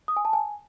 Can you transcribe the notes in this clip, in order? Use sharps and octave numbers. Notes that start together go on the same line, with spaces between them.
D#6
G#5
A5
G#5